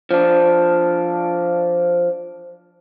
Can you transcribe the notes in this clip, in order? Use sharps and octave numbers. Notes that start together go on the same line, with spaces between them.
F3 D4